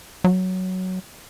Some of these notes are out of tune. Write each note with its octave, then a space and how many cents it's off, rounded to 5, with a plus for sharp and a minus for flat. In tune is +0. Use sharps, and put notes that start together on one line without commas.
F#3 +5